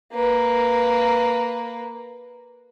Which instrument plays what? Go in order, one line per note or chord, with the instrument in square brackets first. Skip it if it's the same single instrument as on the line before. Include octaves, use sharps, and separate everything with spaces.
[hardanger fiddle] A#3 B4